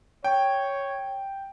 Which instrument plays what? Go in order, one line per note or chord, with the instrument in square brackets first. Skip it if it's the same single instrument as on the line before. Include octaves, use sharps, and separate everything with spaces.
[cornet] C#5 [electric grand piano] G5